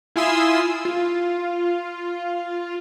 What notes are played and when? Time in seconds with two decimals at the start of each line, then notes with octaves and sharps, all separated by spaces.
0.16 E4 F4 G#5 C6 D#6 E6
0.85 F4